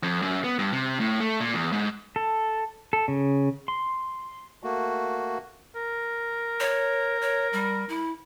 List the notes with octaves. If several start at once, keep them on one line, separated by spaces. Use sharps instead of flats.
F2
F#2
B3
G2
C3
A2
A3
A#2
E2
G#2
A4
A4
C#3
C6
A3 A#3 F#4
A#4
C#5
C#5
G3
E4